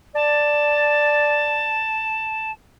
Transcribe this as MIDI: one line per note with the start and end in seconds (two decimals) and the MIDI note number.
0.15 1.86 74
0.15 2.51 81